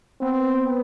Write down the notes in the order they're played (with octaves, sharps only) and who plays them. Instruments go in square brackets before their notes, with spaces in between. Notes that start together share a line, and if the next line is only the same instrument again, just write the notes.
[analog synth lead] B3 [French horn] C4